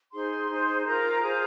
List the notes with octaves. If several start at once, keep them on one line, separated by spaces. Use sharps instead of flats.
D#4 G#4 C5 C6
D#4 G#4 C5
F4 A#4 A#5
F4 G#4 C5